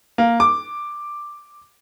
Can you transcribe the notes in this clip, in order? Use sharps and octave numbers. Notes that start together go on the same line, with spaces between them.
A#3
D6